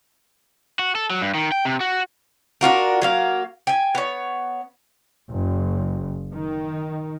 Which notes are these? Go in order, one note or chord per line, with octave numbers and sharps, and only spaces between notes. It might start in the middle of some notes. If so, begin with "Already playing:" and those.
F#4
A4
F#3
G2
D#3
G5
C3
F#4
D4 F4 F#4 A#4
F#3 A#3 F5
G5 G#5
B3 C#5
F#1
D#3